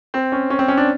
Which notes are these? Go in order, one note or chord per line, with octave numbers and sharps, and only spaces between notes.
C4
C#4
C#4
C4
C#4
D4